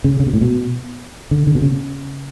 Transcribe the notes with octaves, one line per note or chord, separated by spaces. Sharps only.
C#3
C#3
B2
A2
B2
D3
D3
B2
C#3